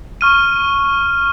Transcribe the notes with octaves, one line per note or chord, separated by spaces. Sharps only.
C#6 F6 D#7